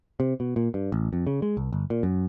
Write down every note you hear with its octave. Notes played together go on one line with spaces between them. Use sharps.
C3
B2
A#2
G2
A1
F2
C#3
G#3
C2
G1
A#2
F#2